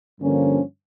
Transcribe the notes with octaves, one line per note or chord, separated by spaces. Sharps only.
G2 D3 F3 A#3 C#4